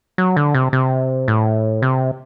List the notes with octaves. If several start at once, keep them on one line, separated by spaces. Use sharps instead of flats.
F#3
D3
C3
C3
A2
C3